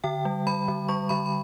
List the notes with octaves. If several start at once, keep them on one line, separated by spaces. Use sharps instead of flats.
D3 G5
G3
G3 B5
D3
G3 C#6
D3 B5
B5